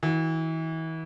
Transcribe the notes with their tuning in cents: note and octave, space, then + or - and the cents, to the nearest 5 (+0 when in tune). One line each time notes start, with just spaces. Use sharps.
E3 -35 F#4 -20